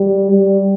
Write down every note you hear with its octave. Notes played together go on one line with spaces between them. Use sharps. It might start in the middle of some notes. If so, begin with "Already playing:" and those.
Already playing: G3
G3